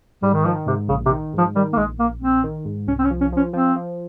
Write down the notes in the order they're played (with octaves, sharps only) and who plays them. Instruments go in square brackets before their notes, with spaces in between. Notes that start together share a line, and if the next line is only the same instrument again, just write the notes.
[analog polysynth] G#2 [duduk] G3
[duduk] D#3
[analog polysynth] D#3 [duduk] F3
[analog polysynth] G#2 [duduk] C3
[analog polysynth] A#1 [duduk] C#3
[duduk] C3
[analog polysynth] D#3
[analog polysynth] G#2 [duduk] F3
[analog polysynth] D#3 [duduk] G3
[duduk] A#3
[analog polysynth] A#1 [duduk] G#3
[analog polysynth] A#1 [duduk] A#3
[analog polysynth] A#1 [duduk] C4
[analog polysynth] D#3
G#2
[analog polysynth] C2 [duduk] C#4
[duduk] C4
C#4
[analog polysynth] F3
[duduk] C#4
[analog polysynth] F3 [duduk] C#4
[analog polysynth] F3 [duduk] C4
[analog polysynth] F3